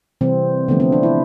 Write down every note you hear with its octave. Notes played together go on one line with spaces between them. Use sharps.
C3 E3 G3 C4
D3 F3 A3 B3
C4
D4
E4